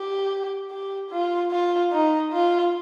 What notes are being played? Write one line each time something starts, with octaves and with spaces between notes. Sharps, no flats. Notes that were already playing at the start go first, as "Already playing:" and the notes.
Already playing: G4
G4
F4
F4
D#4
F4